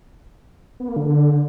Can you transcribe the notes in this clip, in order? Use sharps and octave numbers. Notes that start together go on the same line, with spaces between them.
B3
A#3
D3